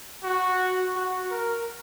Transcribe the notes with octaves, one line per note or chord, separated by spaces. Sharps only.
F#4
F#4
A#4